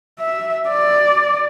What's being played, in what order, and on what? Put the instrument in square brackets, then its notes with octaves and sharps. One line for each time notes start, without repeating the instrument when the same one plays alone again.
[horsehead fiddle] E5
D5